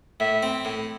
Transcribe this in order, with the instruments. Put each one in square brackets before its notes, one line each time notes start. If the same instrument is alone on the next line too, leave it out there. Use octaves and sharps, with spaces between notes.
[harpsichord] A2 [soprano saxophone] E5
[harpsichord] C4
A2